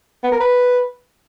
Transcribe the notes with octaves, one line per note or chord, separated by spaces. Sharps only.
B3
A#4
B4